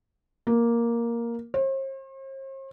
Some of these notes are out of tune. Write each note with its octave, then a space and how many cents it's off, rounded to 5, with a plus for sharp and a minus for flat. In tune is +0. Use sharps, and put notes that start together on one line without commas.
A#3 +5
C5 +45